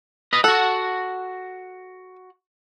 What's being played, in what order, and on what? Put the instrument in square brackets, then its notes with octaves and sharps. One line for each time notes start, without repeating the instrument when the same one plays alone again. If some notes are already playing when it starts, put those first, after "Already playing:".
[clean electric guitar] B4 D#5
[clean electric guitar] F#4 F#5 [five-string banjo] A4